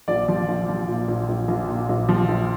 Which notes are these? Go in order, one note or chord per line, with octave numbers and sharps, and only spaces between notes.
A#1 D5
F3
A#1
F3
A#2
A#1
A#1
A#1
A#2
A#1
F3
A#1